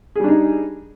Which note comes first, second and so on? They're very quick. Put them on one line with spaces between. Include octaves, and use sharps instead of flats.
G#4 G3 D4 D#4